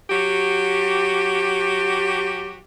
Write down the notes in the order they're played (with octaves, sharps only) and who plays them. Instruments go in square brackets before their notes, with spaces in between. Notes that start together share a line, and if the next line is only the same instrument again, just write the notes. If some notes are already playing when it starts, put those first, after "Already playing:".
[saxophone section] F#3 F#4 G4